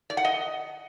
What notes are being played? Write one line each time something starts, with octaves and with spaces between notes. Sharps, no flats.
D5
F#5
D#5